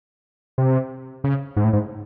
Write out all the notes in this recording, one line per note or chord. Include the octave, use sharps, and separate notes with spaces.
C3
C#3
G#2
A2
G#2